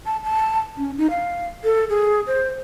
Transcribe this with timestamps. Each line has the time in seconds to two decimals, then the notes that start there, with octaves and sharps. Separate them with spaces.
0.06 A5
0.24 A5
0.78 C#4
0.98 D#4
1.10 F5
1.64 A4
1.90 G#4
2.27 C5